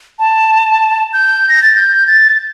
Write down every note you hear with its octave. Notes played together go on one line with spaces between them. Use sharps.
A5
G6
A#6
A6
G6
A6